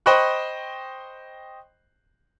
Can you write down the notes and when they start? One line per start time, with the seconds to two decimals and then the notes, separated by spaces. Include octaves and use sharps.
0.06 C5 D#5 G5 B5 C#6 F#6